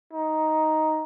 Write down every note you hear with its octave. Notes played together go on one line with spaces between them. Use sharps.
D#4